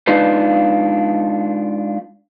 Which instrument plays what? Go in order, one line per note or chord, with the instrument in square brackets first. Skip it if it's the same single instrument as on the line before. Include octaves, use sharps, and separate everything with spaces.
[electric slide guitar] G#3 D4 D#4 F4 B4 F5